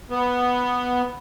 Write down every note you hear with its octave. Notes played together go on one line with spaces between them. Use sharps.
B3